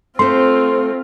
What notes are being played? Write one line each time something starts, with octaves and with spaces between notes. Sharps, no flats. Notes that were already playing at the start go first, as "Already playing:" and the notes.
A3 C4 F4 C5 C6